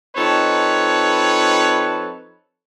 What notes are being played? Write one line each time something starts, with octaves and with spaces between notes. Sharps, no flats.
F3 C4 D#4 A4 B4 C#5